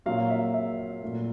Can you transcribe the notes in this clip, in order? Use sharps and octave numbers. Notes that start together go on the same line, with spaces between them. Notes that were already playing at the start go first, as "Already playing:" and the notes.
A#2 F#3 A#3 F5
E5
E5
A#2 F#3 A3